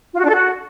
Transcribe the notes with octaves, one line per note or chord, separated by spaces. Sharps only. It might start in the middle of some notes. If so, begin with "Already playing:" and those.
F4
F#4
D4
A4
F#4